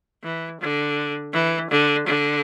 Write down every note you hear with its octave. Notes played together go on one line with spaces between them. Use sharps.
E3
D3
E3
D3
D3